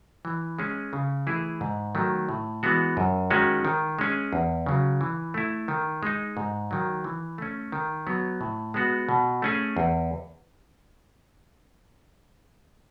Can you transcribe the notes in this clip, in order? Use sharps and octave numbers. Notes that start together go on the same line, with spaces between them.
E3
G#3 C#4 G#4
C#3
E3 A3 E4 G#4
G#2
D#3 F#3 A3
A2
E3 G#3 B3 F#4
F#2
D#3 G#3 C#4 F#4
D#3
G#3 C#4 G#4
E2
C#3 F#3
E3
A3 E4
D#3
G#3 D#4
G#2
D#3 F#3
E3
A3 C#4
D#3
F#3 B3
A2
G#3 B3 F#4
B2
A3 C#4 G#4
E2